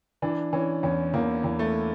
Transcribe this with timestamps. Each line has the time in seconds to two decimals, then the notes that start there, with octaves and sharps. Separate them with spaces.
0.22 E3 D4
0.53 E3 C#4
0.83 E2 C#4
1.14 E2 A#3
1.44 E2
1.59 A3